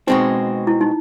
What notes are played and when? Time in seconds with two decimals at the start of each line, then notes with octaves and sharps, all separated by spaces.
0.07 B2 G#3 C4 D#4
0.67 E4
0.81 D#4